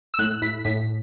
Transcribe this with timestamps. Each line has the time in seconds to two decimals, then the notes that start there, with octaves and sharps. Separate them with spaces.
0.14 E6
0.19 A2 F#6
0.42 A2 B6
0.64 A2 B6